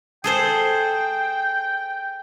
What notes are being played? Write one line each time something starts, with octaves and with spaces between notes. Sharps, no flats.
G#4 A4 C5 G5